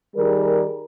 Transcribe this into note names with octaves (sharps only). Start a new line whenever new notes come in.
D#3 G3 G#4 A#4